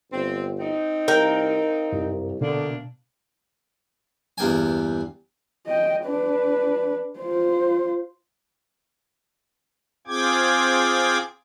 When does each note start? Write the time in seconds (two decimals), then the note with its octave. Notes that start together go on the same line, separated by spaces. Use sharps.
0.12 G1 C4
0.59 C4 D#4
1.08 C2 A#4 F5 G5
1.92 C2 F#2
2.41 D2 B2 D3 A#3 D4
4.38 E2 G2 A#3 G5 G#5
5.67 D#5 G5
6.05 D4 B4
7.20 F4 C5
10.07 C4 F4 G#4 G5 D6 G#6